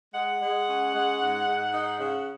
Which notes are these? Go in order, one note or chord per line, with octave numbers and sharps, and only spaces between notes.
G#3 F#5
G#3
C#4
G#3
G#2
G#2
D#4
C#3